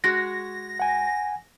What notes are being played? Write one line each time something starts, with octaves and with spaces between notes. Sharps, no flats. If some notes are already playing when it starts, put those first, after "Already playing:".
G#3 F#4 A#6
F#5 G#5